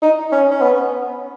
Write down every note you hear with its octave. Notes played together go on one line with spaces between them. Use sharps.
D#4
C#4
C#4
B3